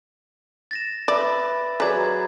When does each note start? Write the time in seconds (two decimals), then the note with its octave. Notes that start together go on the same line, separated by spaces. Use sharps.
0.71 A6 A#6 E7
1.08 B4 D5 E5 A6
1.80 F#3 G#4 B4 D5 A#5 G#6